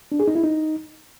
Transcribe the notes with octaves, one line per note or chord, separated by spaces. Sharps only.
D4
G#4
D#4
E4
D#4